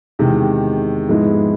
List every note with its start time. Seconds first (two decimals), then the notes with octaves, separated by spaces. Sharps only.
0.19 E2 C3 D#3 G#3
1.09 G#2 F3 G#3 B3 E4